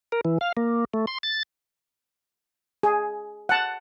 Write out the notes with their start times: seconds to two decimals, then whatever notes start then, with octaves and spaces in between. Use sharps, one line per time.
0.12 A#4
0.25 E3
0.41 F5
0.57 A#3
0.94 A3
1.07 C6
1.23 A6
2.83 G#4
3.49 F#5 A5